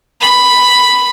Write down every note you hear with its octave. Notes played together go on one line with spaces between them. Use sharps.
B5